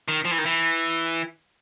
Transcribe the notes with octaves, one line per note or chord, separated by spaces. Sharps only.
D#3
F3
E3
D#3
E3